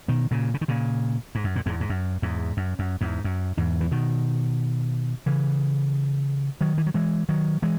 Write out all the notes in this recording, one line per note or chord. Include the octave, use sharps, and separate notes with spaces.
B2 D#3
A#2 C#3
C#3
D#3
A#2 C#3
G#2
F#2
A#2
E2 G#2
G#2
F#2
E2 G#2
F#2
F#2
E2 G#2
F#2
E2 G#2
E3
B2 D#3
C#3 E3
D#3 F#3
E3
F#3
E3 G#3
D#3 F#3
E3 G#3